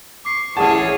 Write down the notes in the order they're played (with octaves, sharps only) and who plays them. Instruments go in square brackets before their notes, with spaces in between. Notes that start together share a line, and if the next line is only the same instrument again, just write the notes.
[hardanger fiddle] C#6 [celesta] D6 C7
[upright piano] A1 A5 [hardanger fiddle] E4 C#5 [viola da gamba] G#4 [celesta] F#5